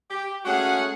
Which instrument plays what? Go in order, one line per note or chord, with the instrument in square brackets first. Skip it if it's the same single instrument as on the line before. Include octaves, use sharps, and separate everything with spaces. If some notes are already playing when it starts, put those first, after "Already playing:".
[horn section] G4
G#3 A3 C#4 F#4 G#4 F#5